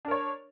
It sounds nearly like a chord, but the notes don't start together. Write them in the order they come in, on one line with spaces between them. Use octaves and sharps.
D4 A#4 C#5